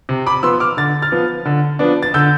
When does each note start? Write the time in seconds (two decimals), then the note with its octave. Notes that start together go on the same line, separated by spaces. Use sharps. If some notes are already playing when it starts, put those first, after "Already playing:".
0.09 C3
0.26 B5 D6
0.43 F3 B3 C6 E6
0.60 D6 F6
0.77 D3 A6
1.02 F6 A6
1.12 F3 B3
1.45 D3
1.79 F3 B3 D4
2.03 A6
2.14 D3 E6 G6